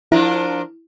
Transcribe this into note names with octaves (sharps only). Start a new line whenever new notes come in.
F3 D4 E4 A#4